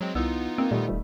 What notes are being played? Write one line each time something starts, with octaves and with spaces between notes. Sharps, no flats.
F#3 G#3 C4
C2 E3 B3 D#4 F4 E6
A#3 C4
D#2 A#2 G3 A3
D#1